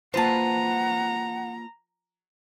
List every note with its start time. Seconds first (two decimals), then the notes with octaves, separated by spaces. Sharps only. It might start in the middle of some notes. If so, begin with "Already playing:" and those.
0.14 A#3 F4 B4 C5 F#5 A5 A#5